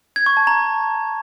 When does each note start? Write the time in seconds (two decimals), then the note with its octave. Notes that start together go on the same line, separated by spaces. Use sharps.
0.16 G#6
0.26 C#6
0.37 A5
0.47 A#5